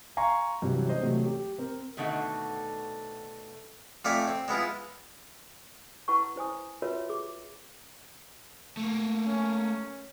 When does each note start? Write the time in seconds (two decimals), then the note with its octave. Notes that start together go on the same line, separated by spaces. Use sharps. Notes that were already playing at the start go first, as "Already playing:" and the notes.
0.17 F5 G#5 A#5 C6 C#6
0.62 G2 C3 E3 F#3 G3
0.88 G#3 D4 C5 D#5
1.02 C3 E3 F#3 A3
1.26 G4
1.58 C4 A#4
1.97 B2 D3 D#3 A3 C4 F#5
4.05 F2 F3 A3 D5 E5 G#5
4.28 C4
4.48 G#3 B3 E4 F4
6.08 E4 B4 F#5 A5 B5 C#6
6.36 E4 C5 G#5 D#6
6.82 F4 F#4 A#4 B4 C#5 E5
7.10 G#4 D6
8.77 A3 A#3
9.26 C#4